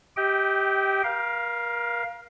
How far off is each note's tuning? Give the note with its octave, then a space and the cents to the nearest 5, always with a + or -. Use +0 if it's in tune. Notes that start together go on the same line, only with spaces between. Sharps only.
G4 +0 D#5 +35 G5 -20
A#4 +35 F5 +0